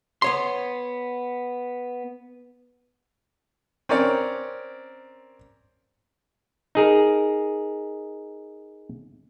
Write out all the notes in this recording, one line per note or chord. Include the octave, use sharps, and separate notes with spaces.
B3 C#5 C6
C4 C#4 A#4 D5
D#4 G#4 A#4